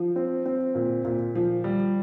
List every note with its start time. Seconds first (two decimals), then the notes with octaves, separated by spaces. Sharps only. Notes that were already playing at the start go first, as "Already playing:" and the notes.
Already playing: F3
0.16 C4
0.46 C4
0.75 A#2
1.05 A#2
1.35 F3
1.64 G3